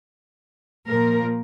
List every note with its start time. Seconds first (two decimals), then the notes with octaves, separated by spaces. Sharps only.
0.86 A#2 F3 A#4